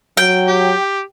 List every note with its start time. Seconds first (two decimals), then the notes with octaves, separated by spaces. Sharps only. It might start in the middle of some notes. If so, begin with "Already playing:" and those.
0.17 F#3 G5
0.48 G4